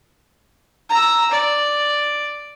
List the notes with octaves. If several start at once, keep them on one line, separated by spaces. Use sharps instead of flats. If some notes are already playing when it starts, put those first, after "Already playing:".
A#5 E6
D5